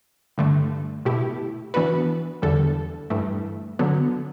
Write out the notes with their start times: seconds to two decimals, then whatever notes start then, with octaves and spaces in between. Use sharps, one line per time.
0.38 G2 D3 A3
1.05 B2 A3 E4 G4
1.74 E3 B3 D4 F#4 B4
2.42 E2 D3 G3 D4 A4
3.10 G2 E3 A3
3.79 D3 F#3 B3